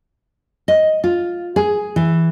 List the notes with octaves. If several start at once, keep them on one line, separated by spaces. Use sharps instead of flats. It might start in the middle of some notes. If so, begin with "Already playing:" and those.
D#5
F4
G#4
E3